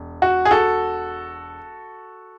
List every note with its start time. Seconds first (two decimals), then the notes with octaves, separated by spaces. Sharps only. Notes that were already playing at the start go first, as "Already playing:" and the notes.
Already playing: E1
0.22 F#4
0.45 G#4
0.51 F#4 A4